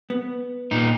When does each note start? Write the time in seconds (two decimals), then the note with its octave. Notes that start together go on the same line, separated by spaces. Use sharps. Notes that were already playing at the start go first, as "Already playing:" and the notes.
0.10 B3
0.71 A#2 D#4